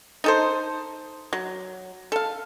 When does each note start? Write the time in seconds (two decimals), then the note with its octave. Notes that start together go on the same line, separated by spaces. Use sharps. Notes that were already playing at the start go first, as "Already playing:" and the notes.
0.24 D#4 A4 C5
1.33 F#3
2.12 A4 F5